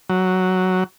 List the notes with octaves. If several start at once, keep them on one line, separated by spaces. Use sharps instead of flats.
F#3